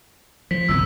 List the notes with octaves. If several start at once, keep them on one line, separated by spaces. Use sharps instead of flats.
F3 B6
G1 C2 A2 E6